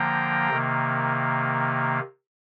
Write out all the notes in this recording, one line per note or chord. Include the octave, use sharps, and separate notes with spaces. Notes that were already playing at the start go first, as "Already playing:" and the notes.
Already playing: D3 F3 A#3 G5 A#5
C3 D#3 A#3